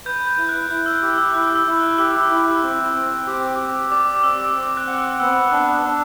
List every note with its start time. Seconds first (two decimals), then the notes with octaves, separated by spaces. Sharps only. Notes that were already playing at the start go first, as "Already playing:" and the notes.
0.05 B4 G6
0.27 G6
0.38 E4
0.49 F#6
0.70 E4 F#6
0.86 E6
1.02 G4
1.18 E6
1.34 E4 F#6
1.56 E6
1.67 E4
1.77 F#6
1.98 G4 E6
2.31 E4
2.63 C4
2.96 C4
3.27 G4
3.59 G4
3.91 D5 D6
4.24 C4 E6
4.56 C4
4.77 F#6
4.87 F#5
4.98 E6
5.20 B3 E6
5.52 D4
5.84 D4